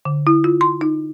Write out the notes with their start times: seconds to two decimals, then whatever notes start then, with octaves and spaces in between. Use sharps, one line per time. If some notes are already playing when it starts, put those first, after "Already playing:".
0.05 D3
0.27 E4
0.44 F4
0.61 C6
0.81 D#4